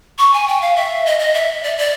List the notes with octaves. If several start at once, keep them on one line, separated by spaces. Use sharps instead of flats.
C#6
G#5
G5
F5
E5
D#5
D#5
E5
D5
D5